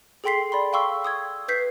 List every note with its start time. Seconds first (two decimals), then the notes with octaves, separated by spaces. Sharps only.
0.24 G#4 A4 G5 C6 B6 C7
0.52 D5 B5 C6
0.73 F5 G5 C6 C#6 E6
1.04 D#6 E6 G#6
1.48 B4 G6 B6 C7